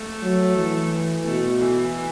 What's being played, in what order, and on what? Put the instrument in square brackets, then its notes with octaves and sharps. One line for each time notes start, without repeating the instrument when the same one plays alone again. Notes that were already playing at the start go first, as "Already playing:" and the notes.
Already playing: [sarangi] A3
[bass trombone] F#3
E3
[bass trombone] B2 [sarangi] A3
[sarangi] E3